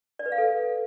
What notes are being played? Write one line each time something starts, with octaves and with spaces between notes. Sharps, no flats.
D5
B4
F5
A4